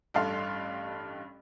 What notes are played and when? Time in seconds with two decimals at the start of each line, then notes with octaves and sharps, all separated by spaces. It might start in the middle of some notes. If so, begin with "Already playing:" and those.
0.14 A1 G2 A4 F5 C6